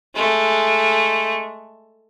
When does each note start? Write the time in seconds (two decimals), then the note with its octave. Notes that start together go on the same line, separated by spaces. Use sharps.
0.15 G#3 A3